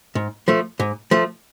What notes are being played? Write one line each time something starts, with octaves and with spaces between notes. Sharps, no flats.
G#2
F3 A3
G#2
F3 A3